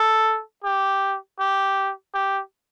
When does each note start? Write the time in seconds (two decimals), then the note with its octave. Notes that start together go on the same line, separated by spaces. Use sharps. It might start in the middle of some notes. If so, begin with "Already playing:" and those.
Already playing: A4
0.64 G4
1.39 G4
2.14 G4